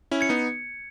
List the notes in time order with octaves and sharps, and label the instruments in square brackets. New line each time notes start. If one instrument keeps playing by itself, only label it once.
[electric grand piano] C#4 E4
[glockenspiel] G#6 C#7
[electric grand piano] B3 D#4